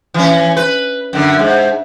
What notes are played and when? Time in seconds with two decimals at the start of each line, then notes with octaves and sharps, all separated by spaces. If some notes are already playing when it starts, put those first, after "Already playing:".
0.14 E3 C#4
0.57 B4
1.13 F#2 D3
1.39 G#2